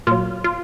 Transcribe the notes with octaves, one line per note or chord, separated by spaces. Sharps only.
A#2 F#3 F4
F4